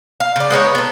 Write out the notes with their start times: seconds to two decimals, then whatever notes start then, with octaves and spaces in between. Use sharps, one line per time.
0.20 F5
0.36 C#3 D5
0.50 G#3 B3 D#4 C#5
0.75 B3 A4